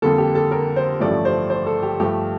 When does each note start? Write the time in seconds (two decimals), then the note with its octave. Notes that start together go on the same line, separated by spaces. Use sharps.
0.02 F2 D3 G3 A#3 A4
0.18 G4
0.35 A4
0.51 A#4
0.76 C5
1.00 A1 G2 F3 A3 D5
1.25 C5
1.50 C5
1.66 A4
1.83 G4
2.00 G2 F3 A3 G4